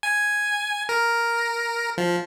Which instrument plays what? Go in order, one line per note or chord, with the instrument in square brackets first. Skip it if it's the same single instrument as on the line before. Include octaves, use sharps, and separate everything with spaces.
[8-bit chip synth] G#5
A#4
F3